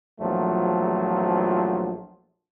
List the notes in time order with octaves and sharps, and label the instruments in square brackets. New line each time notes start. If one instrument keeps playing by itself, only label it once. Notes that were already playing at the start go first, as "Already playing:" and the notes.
[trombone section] A#1 E2 F3 F#3 A3